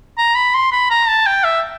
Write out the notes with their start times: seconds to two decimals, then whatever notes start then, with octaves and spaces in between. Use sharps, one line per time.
0.18 A#5
0.35 B5
0.54 C6
0.72 B5
0.90 A#5
1.08 A5
1.26 G5
1.44 E5